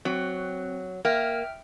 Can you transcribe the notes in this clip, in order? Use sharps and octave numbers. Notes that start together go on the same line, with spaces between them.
F#3 C4
A#3 E5 G5 F6